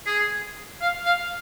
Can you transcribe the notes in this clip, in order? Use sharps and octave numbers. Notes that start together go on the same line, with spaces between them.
G#4
F5
F5